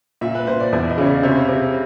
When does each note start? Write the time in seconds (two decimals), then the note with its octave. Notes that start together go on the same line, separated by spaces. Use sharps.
0.21 A#2 E5
0.35 B4
0.47 A#2 C5
0.60 D5
0.72 E2 E5
0.89 D#5
0.98 C#3 C#5
1.06 D5
1.23 C3 C#5
1.48 C3